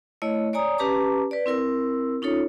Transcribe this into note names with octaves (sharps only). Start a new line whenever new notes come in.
A3 E4 C#5 D#5
C#5 D5 G#5 A#5 D#6
C#4 G4 B4 A5 A#5 D6
B4 D5
C4 E4 A#4 E6
C#4 D#4 F4 A4 C#5